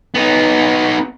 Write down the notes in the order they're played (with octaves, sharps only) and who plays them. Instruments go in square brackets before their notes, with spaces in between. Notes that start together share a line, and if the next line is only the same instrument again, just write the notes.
[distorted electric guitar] B3 D#4